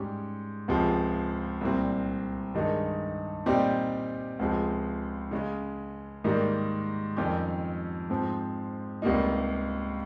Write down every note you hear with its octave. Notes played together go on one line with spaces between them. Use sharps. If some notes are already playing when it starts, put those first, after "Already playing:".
Already playing: G#2 G3 C#4 G4
C#2 C3 F3 G#3
C2 A#2 G3 C4
G2 D#3 G#3 D#4
A#2 G3 C4 D#4 G4
C#2 C3 F3 G#3
C#3 G#3 C#4
G#2 D#3 G3 A#3
F2 D#3 G3 C#4 G4
G#2 F3 C4
C#2 C3 G3 A#3 D#4